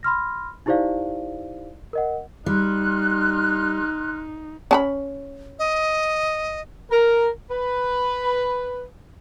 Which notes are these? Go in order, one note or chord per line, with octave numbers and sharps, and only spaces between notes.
B5 C6 F6 A#6
D#4 E4 G4 C5 D5 F5
A#4 D#5 F#5
G3 D#4 C6 F6 F#6
C#4 A5 B5
D#5
A#4
B4